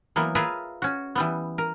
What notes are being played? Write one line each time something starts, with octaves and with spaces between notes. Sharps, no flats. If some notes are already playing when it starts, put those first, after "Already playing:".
E3 F#3 A#3 B3
F4 G#4 A#4 B4 E5
C#4 F#4
E3 G3 B3
A#4